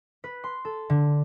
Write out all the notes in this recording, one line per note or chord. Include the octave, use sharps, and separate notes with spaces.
B4
C6
A4
D3